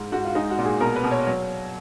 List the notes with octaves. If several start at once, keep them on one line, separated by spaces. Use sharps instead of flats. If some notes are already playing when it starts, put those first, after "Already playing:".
Already playing: G#2
G#2 F#4
F4
G#3 D#4
F#4
A#2
G#4
B2 A#4
B4
B2
C#5
F#3 C#5